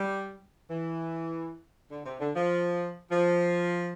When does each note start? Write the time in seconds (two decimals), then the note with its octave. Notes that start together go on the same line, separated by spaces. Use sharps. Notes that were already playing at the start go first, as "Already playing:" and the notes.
Already playing: G3
0.69 E3
1.90 D3
2.05 C3
2.20 D3
2.35 F3
3.11 F3